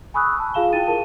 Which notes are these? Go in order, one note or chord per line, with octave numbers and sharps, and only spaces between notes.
G#5 B5 C#6 D#6 E6 F#6
A5
F4 G#4 F5 E7 G7
E4 G5 A6 D#7
G#4 A#4 A5